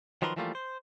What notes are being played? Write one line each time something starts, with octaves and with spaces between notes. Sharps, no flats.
D#3 F3 F#3 A#4 B4 C6
E3 F3 G3 A3 A#3 F4
C5